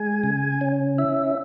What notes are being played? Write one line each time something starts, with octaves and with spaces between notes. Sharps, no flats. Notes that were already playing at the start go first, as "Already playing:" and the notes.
Already playing: G#3 G#5
C#3
C#4
E4 E5